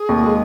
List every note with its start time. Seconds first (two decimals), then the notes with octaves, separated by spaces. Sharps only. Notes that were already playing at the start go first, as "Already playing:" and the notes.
Already playing: G#4
0.09 D#2
0.24 G#3